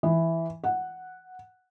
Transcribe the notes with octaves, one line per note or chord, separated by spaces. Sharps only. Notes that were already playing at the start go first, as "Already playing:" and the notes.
E3
F#5